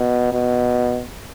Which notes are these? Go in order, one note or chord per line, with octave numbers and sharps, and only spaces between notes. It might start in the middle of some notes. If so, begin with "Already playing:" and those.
Already playing: B2
B2